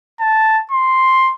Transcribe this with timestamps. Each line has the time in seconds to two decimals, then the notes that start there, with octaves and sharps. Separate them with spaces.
0.20 A5
0.72 C6